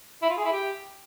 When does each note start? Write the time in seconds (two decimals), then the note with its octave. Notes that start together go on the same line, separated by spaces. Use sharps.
0.22 E4
0.30 F4
0.37 G#4
0.45 E4
0.52 G4